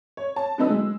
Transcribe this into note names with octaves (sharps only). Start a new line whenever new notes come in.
C#5
A5
D3 F#3 B3 D#4 B4 E6
G#3